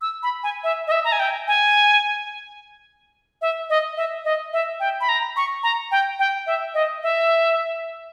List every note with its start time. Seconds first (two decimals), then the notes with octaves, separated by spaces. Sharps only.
0.02 E6
0.23 B5
0.43 G#5
0.64 E5
0.87 D#5
0.92 E5
1.04 A#5
1.12 G#5
1.20 G5
1.48 G#5
3.42 E5
3.70 D#5
3.97 E5
4.25 D#5
4.53 E5
4.80 G5
5.01 B5
5.09 A#5
5.37 C#6
5.63 A#5
5.91 G5
6.19 G5
6.47 E5
6.74 D#5
7.03 E5